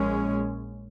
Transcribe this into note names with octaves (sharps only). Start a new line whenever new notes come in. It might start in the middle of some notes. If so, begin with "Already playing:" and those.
Already playing: A#1 A#2 G#3 C#4